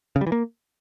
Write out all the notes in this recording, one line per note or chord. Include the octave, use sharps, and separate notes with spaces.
C#3
G3
E3
A#3